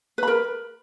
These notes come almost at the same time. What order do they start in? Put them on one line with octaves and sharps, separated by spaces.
B4 B5 A#4